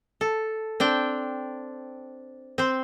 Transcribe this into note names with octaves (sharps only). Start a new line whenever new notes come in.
A4
C4 D4 G5
C4 C5